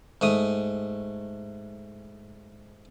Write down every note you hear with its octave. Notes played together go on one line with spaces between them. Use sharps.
G#2 A3 D#6